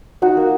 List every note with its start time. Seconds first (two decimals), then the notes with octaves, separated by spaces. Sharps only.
0.22 D#4 F#4
0.37 A#3